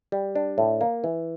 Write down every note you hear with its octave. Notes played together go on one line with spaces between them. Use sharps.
G3
D4
A2
A#3
E3